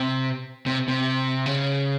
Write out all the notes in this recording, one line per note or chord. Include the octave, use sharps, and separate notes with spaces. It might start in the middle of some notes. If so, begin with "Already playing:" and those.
Already playing: C3
C3
C3
C#3